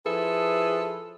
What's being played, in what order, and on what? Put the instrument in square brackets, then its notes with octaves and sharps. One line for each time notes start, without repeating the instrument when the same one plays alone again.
[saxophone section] F3 E4 G#4 A4 B4